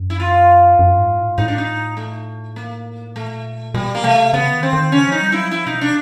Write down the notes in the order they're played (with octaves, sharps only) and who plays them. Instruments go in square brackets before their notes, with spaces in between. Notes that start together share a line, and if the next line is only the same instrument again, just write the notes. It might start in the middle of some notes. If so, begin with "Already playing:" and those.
Already playing: [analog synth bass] F#2
[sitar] E4
F4
[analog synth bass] F#2
G#2
A2
G#2
[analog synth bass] A2 [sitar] D#4
[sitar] D4
D#4
A3
A#3
[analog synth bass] A#2 [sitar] A3
[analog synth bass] B2 [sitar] G3
[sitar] A#3
[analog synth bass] C3 [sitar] A3
[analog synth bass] C#3 [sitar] B3
[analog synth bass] D#3
[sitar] C4
[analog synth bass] D#3
[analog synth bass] C#3 [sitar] C#4
[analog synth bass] F3 [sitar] D#4
[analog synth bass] G3
[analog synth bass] F#3 [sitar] E4
[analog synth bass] F3 [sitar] E4
[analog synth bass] B2 [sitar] D#4
[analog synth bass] C3 [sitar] D4